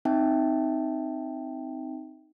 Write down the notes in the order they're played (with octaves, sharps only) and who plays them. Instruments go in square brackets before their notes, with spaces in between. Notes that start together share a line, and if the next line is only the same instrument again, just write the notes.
[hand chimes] C4 D#4 E5 G5 A5